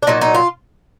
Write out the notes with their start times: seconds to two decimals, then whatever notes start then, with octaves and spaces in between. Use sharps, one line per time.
0.03 D4
0.07 A#2 F#3 D#4
0.21 D#4
0.35 F4